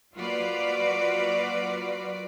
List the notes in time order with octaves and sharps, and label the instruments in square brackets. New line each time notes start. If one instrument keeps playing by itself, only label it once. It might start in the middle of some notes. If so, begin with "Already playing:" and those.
[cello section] F#3 A#3 F4 F#4 B4 D5